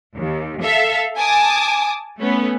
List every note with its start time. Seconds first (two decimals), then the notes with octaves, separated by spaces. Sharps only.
0.17 D#2
0.62 A4 E5 F5
1.18 G#5 A5 D6 D#6
2.21 A3 B3 C#4